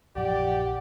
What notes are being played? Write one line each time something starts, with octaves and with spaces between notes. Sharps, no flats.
A#1 F#2 F3 G4 D5 F#5